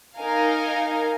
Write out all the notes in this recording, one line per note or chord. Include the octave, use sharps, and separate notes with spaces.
D#4 A#4 F5 G#5